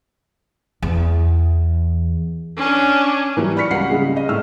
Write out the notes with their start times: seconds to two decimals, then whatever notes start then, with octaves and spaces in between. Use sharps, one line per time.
0.82 E2
2.57 C#4 D4
3.37 E3 F#3 G3
3.56 D5 B5 C#6 F6 B6 C#7
3.70 C#2 G3 F#5 C7
3.91 C#3 G3 G#3
4.17 D#5
4.29 A2 E6 F6